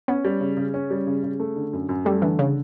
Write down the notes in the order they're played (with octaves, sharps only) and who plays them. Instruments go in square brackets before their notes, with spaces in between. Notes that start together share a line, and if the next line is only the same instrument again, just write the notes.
[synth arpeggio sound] B3 [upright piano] C#4
[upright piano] G3
C#3
C#3
C#4
G3
C#3
C#3
A3
D3
F#2
F#2
[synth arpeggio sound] G3 [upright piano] A3
[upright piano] D3 [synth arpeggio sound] E3
[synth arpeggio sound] C#3